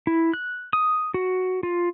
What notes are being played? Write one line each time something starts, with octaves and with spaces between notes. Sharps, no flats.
E4
F#6
D#6
F#4
F4